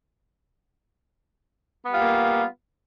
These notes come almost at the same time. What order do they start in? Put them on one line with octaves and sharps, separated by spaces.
B3 G3 F4 A#3